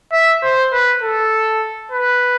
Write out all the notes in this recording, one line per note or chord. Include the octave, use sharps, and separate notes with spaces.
E5
C5
B4
A4
B4